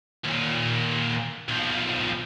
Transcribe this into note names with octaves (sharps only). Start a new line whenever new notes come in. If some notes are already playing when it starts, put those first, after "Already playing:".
D#2 A#2
B1 F3